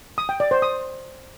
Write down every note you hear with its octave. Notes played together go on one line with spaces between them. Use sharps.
D#6
G5
D5
C5
D#6